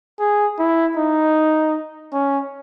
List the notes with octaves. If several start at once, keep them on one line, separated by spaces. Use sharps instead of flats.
G#4
E4
D#4
C#4